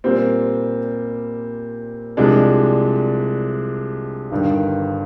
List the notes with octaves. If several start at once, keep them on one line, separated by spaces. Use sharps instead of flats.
A#2 G3 C4
C2 C3 F3 G#3 D4
G1 G2 D#3